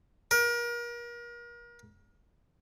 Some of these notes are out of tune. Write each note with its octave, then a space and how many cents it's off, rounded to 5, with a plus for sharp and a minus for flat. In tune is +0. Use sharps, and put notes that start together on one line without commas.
A#4 +35